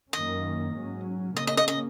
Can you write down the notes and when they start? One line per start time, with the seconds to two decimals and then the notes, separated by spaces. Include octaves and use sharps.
0.13 F#2 D#3 A#3 C#4 D#5
0.75 G#2 F#3 C#4
1.36 C#3 A#3 C#4 D#5
1.47 D#5
1.57 D#5
1.68 D#5